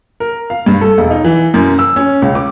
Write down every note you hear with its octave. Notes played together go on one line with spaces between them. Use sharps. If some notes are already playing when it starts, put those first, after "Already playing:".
A#4
F5
G2
A4
E1
D#4
E3
F#2
E6
C#4
C#2
D6